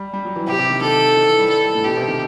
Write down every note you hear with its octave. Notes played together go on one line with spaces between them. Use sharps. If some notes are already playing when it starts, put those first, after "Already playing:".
Already playing: G3
G3
F#3
E3
C3 G4
C3
D#3
D#3 A4
D#3
E3
G3
A4
A2
B2 G4
C3
D#3